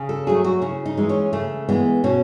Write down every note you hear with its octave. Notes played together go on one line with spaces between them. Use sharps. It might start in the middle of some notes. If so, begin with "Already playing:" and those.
Already playing: C#3
A4
F#3 A3 G#4
F#4
C#3 E4
D#4
E3 G#3
C#4
C#3 A3
E3 G#3 B3
B2 C#4